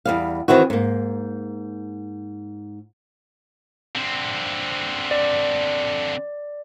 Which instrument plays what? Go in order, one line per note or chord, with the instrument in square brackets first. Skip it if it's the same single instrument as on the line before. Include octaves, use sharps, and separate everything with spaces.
[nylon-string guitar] E2 G3 F5
D#3 E3 C4 E4 F#4
G#2 A#3
[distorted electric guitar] D3 C4
[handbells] D5